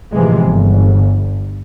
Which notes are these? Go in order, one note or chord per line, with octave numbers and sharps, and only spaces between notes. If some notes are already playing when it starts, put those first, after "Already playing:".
A2 C3 E3 F3 G#3
G1